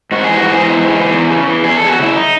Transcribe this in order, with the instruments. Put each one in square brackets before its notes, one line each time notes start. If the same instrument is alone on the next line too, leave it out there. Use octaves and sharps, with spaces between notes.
[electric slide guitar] G#2 F#4
E3 G#4
F#4
G#2 G#4
E3
G#2
E3
E2
C#3
E3
E2 G#4
E2 A4
G#4
F#4
C#3 E4
D#4